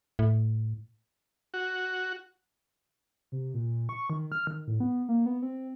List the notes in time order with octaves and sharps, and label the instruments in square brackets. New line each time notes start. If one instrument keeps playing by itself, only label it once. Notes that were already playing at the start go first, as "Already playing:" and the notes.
[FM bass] A2
[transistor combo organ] F#4
[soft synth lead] C3
A#2
C#6
D#3
F6
D#3
A2
B3
A#3
B3
C4